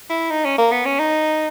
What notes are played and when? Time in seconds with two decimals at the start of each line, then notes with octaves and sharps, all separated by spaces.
0.10 E4
0.31 D#4
0.45 C#4
0.58 A#3
0.72 B3
0.85 C#4
0.99 D#4